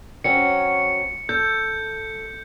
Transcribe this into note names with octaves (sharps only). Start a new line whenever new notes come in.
F#3 C4 C#4 C#7
A4 G6